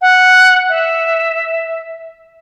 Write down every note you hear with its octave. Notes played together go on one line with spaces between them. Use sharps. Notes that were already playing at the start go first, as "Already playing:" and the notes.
F#5
E5